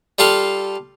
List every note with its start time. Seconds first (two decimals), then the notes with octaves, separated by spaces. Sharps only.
0.19 G3 F4 A4 F5